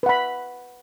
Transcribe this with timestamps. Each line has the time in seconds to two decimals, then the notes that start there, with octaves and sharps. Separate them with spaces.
0.03 B4
0.06 F#5
0.09 B5